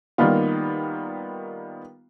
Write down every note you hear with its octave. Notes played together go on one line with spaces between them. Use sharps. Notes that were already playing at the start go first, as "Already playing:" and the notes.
D#3 G3 A#3 B3 F4